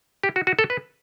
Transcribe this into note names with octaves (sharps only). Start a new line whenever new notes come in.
G4
F#4
F#4
A4
B4